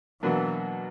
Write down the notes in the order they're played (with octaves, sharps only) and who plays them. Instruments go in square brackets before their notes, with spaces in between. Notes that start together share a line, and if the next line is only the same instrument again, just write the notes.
[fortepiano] B2 F#3 A#3 D4 [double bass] E3